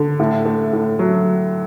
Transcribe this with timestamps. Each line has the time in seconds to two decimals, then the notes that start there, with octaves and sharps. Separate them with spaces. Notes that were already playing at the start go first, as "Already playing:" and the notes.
Already playing: D3
0.20 A2
0.46 A3
0.73 A2
0.99 F#3